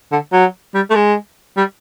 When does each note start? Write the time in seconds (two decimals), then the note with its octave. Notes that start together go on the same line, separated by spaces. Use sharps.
0.12 D3
0.33 F#3
0.74 G3
0.90 A3
0.95 G#3
1.57 G3